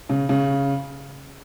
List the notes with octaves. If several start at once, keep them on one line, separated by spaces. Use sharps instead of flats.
C#3
C#3